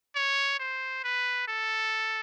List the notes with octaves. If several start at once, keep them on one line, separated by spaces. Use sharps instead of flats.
C#5
C5
B4
A4